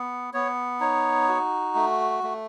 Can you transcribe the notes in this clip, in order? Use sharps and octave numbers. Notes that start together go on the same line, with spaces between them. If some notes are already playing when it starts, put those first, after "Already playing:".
Already playing: B3
B3 C#5
D#4 C#5
F#4
A3
A3